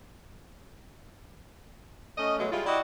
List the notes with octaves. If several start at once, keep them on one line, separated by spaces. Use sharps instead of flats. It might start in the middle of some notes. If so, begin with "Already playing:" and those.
A3 C#4 D#5
B2 F#3 G#3 A3 B3
G3 G#3 E4 F4
E4 F#4 G4 D5 D#5